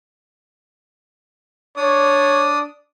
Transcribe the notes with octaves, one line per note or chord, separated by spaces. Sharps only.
D4 C#5 D5 D#6